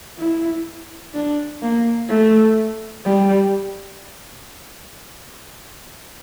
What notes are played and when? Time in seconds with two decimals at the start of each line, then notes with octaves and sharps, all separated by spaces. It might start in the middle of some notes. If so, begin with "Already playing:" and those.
0.19 E4
1.14 D4
1.62 A#3
2.09 A3
3.05 G3